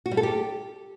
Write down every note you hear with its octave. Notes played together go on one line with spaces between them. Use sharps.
F#4
G3
A4
G4